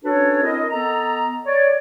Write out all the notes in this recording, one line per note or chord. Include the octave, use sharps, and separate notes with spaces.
C#4 D4 F#4 A4 B4 C#5
C4 E4 A#4 D#5
B3 A4 D#5 A#5
C#5 D5